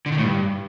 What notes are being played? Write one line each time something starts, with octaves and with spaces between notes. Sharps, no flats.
D3
D#3
A2
G2